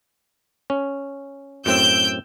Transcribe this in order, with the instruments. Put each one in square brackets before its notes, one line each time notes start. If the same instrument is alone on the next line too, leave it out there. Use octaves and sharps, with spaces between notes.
[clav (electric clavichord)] C#4
[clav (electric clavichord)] F#2 A2 C4 [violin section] E6 G6 D7